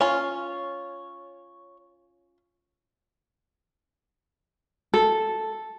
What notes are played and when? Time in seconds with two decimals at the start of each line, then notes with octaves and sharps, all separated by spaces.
0.01 C#4 F4 C#5
4.94 A4